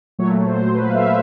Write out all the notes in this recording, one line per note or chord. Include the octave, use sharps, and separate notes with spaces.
A#2 F#3 A3 C#5
C5
B4
F5
E5